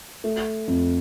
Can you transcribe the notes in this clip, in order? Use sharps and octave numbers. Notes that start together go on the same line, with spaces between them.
A3
F2